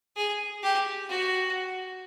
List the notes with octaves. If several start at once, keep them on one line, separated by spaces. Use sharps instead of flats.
G#4
G4
F#4